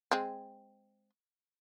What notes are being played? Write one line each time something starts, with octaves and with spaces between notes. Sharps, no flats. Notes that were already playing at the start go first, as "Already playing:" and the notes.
G#3 C4